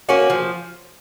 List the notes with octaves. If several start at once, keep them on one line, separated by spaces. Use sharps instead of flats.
A#3 C#4 F#4
F3